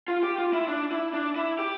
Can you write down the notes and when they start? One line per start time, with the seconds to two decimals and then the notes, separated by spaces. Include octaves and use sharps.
0.08 F4
0.23 G4
0.38 F4
0.53 E4
0.68 D4
0.91 E4
1.13 D4
1.36 E4
1.59 G4